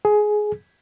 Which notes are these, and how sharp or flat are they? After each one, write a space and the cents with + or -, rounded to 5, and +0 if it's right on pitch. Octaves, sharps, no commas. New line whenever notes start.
G#4 +15